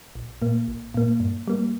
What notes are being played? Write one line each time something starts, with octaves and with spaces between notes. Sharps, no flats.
A#1
A#2 A#3
A#1
A#2 A#3
G2
G3 A#3